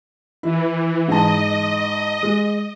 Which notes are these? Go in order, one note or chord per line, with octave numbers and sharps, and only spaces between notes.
E3 E4
G#2 D#5 A5
G#3